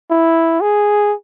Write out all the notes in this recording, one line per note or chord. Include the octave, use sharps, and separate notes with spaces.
E4
G#4